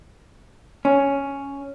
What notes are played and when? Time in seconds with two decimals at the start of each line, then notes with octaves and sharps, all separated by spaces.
0.85 C#4